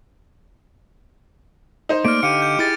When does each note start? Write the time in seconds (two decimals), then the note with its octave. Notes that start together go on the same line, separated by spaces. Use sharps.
1.89 D#4 C5
2.05 A3 A#3 D5 F6 D7
2.23 D3 G4 F5 C#7 D#7
2.41 G6 C#7
2.59 E4 G#4 D6 A6